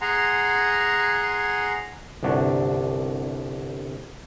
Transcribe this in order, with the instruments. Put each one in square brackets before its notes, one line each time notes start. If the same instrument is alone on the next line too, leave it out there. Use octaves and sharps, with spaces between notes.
[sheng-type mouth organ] G#4 F#5 G#5 A#5 C6
[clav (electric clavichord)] G1 C2 D4 F#4